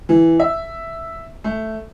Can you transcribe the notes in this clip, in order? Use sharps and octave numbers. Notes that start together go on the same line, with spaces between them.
E3
E5
A3